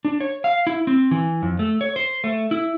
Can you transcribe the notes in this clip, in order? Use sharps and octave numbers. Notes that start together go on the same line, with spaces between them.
D4
C#5
F5
E4
C4
E3
F2
A3
C#5
C5
A3
E4